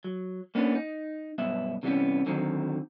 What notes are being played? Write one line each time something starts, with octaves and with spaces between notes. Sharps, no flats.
F#3
A#3 B3 C#4 D4
D#4
B1 G2 B3 E5
C3 E3 G3 A3 B3 C#4
D3 D#3 F#3 C4